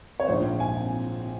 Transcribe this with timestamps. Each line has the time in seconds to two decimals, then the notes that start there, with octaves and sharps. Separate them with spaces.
0.20 C#5
0.27 A#1 G#2 F3 C5
0.60 G#5